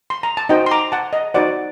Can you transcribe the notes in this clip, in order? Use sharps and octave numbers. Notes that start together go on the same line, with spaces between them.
C6
A#5
A5
D#4 F#4 C5 D#5 G5
C6
A#5 D6
F#5 A5
D#5
D#4 F#4 C5 D5 F#5